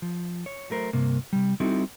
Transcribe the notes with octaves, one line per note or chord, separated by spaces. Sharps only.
F3
C#5
F#3 A3 A#4 C5
G2 C3 A#3
C3 G3
G3 C4 D#4 E4 F#4 A4